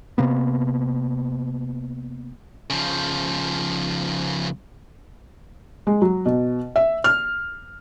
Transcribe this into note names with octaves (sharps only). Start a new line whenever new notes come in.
C3 A#3 B3
C#3 F3
G#3
F#3
B2
E5
F6